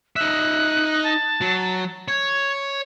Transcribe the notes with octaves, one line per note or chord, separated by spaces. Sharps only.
D#4 E5 F#6
A5
F#3
C#5 G#6